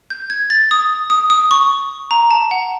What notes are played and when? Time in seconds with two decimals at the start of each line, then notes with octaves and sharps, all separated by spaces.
0.10 G6
0.30 G#6
0.50 A6
0.71 D#6
1.10 D#6
1.30 D#6
1.51 C#6
2.11 A#5
2.31 A5
2.51 F#5